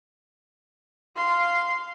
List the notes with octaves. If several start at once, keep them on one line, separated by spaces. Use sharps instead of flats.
F5 C6